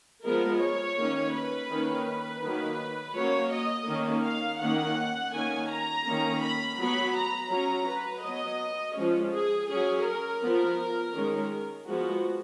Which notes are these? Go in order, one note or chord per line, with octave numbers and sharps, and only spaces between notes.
F3 G#3 B3 A#4
C#5
D#3 A#3 C#4
B4
D#3 A#3 C#4
B4
D#3 F#3 A#3
F#3 A#3 C#4 C#5
D#5
D#3 A#3 C#4
F5
D#3 A#3 C#4 F#5
D#3 A#3 C#4 G#5
A#5
D#3 A#3 C#4
B5
F#3 B3 B5
A#5
F#3 C#4 A#5
B4
F#3 B3 D#5
F3 G#3 C#4
G#4
C#4 G#4
F#3
A#4
F3 B3
D#3 G#3 C#4
F3 G#3 B3 F#4